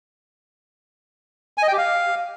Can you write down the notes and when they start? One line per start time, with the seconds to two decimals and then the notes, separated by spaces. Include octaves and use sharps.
1.58 G#5
1.63 D#5
1.68 G5
1.73 G4
1.78 F5